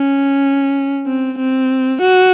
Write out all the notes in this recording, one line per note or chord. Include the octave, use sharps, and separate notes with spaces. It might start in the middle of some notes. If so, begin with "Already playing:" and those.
Already playing: C#4
C4
C4
F#4